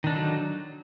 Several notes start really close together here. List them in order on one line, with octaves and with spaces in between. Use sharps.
D#3 D4 D#4 D3 F#3